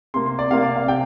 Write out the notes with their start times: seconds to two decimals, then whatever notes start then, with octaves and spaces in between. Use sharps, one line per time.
0.14 C3 A#3 C6
0.26 C6
0.39 D5
0.51 C3 A#3 F5
0.63 D5
0.76 F5
0.88 C3 G5